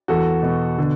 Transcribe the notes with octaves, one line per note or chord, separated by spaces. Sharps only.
E2 F#4 A4
B2
D3